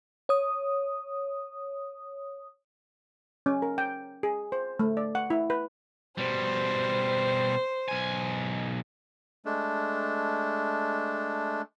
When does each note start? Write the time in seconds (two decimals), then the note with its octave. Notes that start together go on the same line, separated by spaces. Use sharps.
0.29 C#5 D#6
3.46 C#4
3.62 A#4
3.78 G5
4.23 G#4
4.52 C5
4.80 A3
4.97 D5
5.15 F#5
5.30 E4
5.50 B4
6.18 B2 G3 C5
7.88 B1 G#5
9.45 G#3 A3 D4